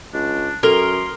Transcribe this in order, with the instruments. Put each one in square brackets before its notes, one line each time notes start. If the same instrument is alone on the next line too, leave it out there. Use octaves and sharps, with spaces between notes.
[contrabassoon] C#2 [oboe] D4
[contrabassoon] F#2 [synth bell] A4 F6 G7 [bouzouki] A#4 [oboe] C6